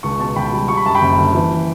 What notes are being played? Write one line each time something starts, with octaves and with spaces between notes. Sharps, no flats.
C#2 A5 C#6
B2 A5 C#6
C#2 G5 B5
G3
G3 C#6
B5
F#2 A5
G5 B5
F#1
D3
E3